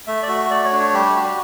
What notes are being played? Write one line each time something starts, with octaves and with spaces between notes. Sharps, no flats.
A3 E5
D5
F#4 E5
A3 D5
C#5
D4
C#5
G3 G4
F#4